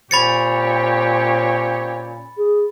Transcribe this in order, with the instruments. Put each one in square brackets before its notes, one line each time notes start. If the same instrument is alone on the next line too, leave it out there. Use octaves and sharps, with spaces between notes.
[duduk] A#2 [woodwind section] C4 G4 C#5 [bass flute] C#4 [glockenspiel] B5 A6 C#7
[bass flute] G#4